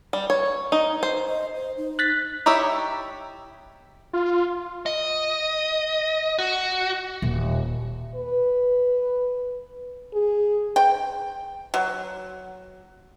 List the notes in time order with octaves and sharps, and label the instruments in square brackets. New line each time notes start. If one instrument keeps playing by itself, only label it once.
[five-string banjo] G3
C#5
D#4
C5
[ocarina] D#5
C5
D#4
[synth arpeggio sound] F#6 A6 B6
[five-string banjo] D#4 E4 G4 C#5 E5
[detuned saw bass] F4
[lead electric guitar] D#5
F#4
[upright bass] D#1
[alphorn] B4
G#4
[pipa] G5
F#3